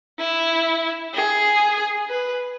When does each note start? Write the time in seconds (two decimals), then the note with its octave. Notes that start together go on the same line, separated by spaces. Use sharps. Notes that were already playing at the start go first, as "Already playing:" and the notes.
0.19 E4
1.14 G#4
2.09 B4